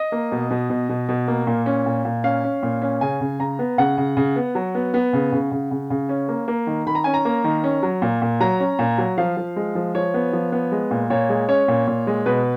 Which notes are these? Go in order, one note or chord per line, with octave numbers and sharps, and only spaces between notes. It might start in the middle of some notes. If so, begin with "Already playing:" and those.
Already playing: D#5
A#3
B2
B2
B2
B2
B2
A#3
A#2
C#4
A#2
A#2
C#4 F5
C#4
A#2
C#4
C#3 G#5
C#3
C#3 A#5
B3
C#3 F#5
C#3
C#3
B3
F#3
B3
B3
C#3
C#3
C#3
C#3
C#3
C#4
A#3
A#3
D#3
D#3 B5
A#5
C#4 G#5
A#5
A#3
D#3
C#4
F#3
A#2
A#2
F#3 A#5
C#4
A#2
F#3
F3 F5
F3
G#3
F3
F3 C#5
B3
F3
B3
G#3
A#2
A#2 C#5
G#3
C#4 C#5
A#2
A#2
G#3
B2 B4